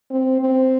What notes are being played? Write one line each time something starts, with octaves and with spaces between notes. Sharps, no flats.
C4
C4